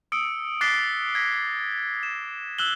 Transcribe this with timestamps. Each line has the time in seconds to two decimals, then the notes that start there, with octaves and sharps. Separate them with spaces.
0.12 D#6 E6 C#7 D7
0.61 D6 F#6 A6 B6 C7 G7
1.15 G#6 A#6 B6
2.03 E7
2.58 E6 F#6 E7 F#7 G7